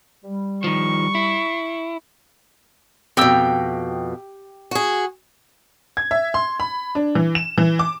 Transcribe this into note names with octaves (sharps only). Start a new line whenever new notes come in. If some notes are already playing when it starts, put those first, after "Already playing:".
G3
D#3 F3 C#6
E4
F2 B2 G4 G5 E6
F#4 G#4
G#6
E5
C6
B5
D4
E3
E7
E3
D6